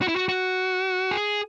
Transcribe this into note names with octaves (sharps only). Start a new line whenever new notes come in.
F#4
E4
F#4
F#4
G#4